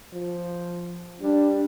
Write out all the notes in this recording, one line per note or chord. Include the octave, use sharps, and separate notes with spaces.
F3
G3 D4